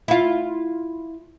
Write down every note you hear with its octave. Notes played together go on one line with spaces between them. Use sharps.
E4 F4